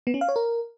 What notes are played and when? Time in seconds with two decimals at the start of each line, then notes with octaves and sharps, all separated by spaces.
0.07 B3
0.14 C#4
0.21 F5
0.28 C#5
0.36 A#4